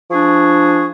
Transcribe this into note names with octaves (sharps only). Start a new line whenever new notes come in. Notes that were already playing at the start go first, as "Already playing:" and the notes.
F3 D4 G#4 C#6